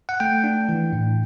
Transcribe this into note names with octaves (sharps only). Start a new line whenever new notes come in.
F#5
A3 G5
D4
E3
A2